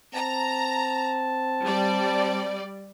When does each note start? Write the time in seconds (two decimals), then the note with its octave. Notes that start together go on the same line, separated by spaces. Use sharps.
0.14 C4 A5 A#5
1.63 G3 D5